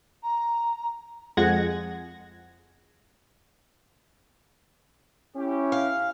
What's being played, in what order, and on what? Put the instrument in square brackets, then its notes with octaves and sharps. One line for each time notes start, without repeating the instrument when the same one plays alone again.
[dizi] A#5
[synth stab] F2 G#3 F#5 G#6 A#6
[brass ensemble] C#4 E4 G4
[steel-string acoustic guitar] F5